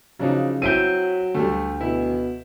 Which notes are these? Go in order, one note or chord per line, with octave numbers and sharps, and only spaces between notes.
C#3 F3 F#3 D4 D#4
F#3 C4 E4 G6 D7 D#7
D2 G3 A3
B2 E4